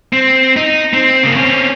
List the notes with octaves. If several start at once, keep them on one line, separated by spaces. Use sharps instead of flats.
C4
D#4
C4
C#3 A#3
C4 C#4